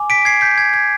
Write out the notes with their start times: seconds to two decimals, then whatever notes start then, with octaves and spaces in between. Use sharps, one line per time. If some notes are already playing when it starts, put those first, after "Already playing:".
Already playing: G#5 D6
0.10 B6 D7
0.25 G#6 C7
0.41 G6 B6
0.58 G#6
0.74 G#6